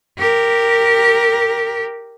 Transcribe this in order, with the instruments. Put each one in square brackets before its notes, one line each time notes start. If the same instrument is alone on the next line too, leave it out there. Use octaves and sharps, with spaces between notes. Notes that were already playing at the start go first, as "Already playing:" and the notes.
[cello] G4 A#4